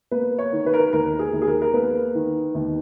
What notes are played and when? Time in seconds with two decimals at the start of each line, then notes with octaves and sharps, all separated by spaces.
0.11 A#3 B4
0.39 C#5
0.53 D#3
0.66 B4
0.74 A#4
0.80 B4
0.93 D#2 A#4
1.19 G#4
1.33 D#2
1.42 G#4
1.47 A#4
1.62 A#4
1.73 A#3 B4
2.15 D#3
2.55 D#2